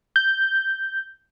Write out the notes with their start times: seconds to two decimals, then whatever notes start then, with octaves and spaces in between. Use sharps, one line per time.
0.16 G6